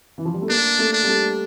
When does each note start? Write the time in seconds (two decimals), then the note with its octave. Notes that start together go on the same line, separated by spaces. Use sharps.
0.18 E3
0.25 F3
0.34 G3
0.42 A3
0.49 A#3 D4
0.79 A3
0.93 D4
1.03 G3
1.08 A3